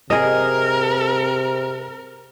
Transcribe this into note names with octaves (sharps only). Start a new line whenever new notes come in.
C3 G#4 A#4 D#5